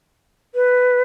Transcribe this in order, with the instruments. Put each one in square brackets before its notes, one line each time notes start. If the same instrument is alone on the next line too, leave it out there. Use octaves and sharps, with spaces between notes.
[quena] B4